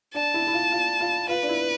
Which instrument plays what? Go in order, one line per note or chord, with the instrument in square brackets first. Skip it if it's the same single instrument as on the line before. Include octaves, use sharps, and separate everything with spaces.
[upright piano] D4 [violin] A5
[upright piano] E4
E4
F4
F4
F4
[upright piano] F4 [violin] B4
[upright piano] D4
E4